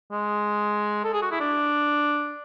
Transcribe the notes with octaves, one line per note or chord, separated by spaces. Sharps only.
G#3
A4
G#4
F#4
E4
D4